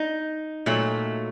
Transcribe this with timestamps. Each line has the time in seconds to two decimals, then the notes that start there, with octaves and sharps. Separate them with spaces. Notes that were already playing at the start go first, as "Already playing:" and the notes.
Already playing: D#4
0.66 A#2 F#3 A3